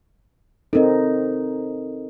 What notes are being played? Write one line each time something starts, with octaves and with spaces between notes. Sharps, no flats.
C4 D#4 A4 A#4 D#5